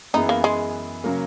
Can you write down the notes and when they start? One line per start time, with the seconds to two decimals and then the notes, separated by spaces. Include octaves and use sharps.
0.14 F#2 E3 B3 D#4 E4 G#4
0.29 A#3
0.44 G#3
1.04 C#3 F#3 A#3